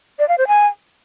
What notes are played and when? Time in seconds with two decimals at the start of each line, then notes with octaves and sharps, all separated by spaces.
0.19 D5
0.28 F5
0.38 C5
0.47 G#5